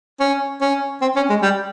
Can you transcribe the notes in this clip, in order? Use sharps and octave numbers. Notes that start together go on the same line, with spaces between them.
C#4
C#4
C4
C#4
G#3
G3